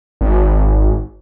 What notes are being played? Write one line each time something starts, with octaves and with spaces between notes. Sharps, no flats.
G#1